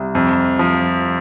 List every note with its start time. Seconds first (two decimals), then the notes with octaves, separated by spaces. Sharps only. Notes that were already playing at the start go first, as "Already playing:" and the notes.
Already playing: C2
0.15 F2
0.59 F3